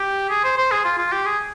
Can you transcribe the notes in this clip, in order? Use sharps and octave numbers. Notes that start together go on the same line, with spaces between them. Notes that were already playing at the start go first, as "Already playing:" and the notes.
Already playing: G4
G#4
C5
C5
G#4
F4
F4
G4
G#4